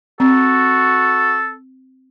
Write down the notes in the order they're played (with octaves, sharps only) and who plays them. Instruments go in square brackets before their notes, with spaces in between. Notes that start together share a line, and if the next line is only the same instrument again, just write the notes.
[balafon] C4 [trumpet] F#4 [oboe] A4